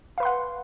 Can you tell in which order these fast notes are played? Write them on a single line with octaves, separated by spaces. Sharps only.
F5 B4 C6 F#5